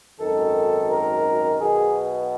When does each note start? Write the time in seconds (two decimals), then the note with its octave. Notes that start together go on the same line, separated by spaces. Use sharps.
0.19 G#1 F#2 D#3 A4
0.90 A#4
1.60 B1 B2 G#4